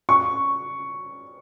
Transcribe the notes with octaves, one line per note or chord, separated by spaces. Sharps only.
C#6